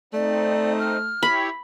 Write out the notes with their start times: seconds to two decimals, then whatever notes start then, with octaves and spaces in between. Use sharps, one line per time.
0.13 A3 C4 D#4 D5
0.79 F6
1.23 E4 G4 C#5 B5